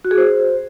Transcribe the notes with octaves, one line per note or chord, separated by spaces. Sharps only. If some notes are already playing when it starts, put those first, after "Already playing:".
F#4
G#4
C5